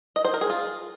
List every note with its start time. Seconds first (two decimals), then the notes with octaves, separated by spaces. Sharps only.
0.16 D#5
0.25 C5
0.34 A#4
0.41 G#4
0.50 F4